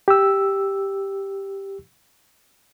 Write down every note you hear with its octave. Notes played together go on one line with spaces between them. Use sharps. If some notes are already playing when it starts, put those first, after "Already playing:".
G4 E6